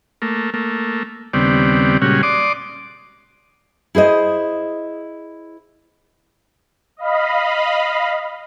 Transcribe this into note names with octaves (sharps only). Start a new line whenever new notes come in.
A3 A#3
A3 A#3
D#2 C#3 G3 B3 C4 D5
A#2 C#3 G3 G#3 C#4 F#4
D5 C6 D6 D#6
E4 G#4 C5 D#5
D#5 F5 B5